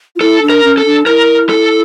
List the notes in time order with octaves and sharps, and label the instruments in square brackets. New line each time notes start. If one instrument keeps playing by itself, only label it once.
[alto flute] F4
[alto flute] E4 [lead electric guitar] A4
[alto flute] D4
[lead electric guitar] A#4
[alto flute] C#4
[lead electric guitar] A4
[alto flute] D4
[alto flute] E4 [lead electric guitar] A#4
[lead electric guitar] A4